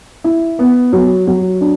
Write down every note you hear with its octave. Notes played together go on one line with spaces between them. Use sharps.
E4
B3
F#3
F#3
D4